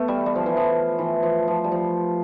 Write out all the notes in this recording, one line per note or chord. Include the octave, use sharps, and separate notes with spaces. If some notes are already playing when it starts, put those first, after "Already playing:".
Already playing: A3 B3
G3
G3
F3
E3
F3
E3
F3
F3
G3
F3